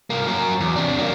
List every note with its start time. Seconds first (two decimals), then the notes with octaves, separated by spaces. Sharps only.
0.10 C2 A#3
0.27 F#3 A#4
0.61 E2
0.76 C3 D4
0.98 F#3 A#3